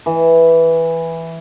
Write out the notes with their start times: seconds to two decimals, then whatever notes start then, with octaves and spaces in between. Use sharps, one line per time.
0.06 E3